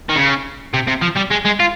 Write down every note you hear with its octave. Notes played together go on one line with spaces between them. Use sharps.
D#3
C#3
C3
C3
F3
G3
G#3
G#3
F4